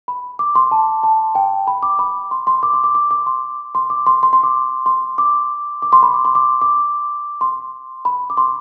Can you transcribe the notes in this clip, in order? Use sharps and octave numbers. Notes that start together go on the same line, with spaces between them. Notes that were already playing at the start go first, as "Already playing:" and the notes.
B5
D6
C6
A5
A5
G5
B5
D6
B5
C6
C6
D6
C6
D6
D6
D6
C6
C6
D6
C6
C6
C6
D6
C6
D6
D6
C6
B5
D6
C6
D6
D6
C6
B5
D6
C6